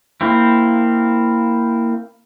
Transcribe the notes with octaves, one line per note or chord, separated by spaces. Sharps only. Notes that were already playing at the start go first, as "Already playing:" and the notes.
A#3 C4 E4